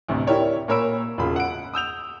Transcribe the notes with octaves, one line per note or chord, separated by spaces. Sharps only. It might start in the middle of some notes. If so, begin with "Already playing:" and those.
A1 D2 C3
E4 G4 A#4 C#5 D5
A#2 A#4 C#5 B5 E6 D7
E1 C#3 F4 B5
F#5 D7
D#6 E6 G6 F7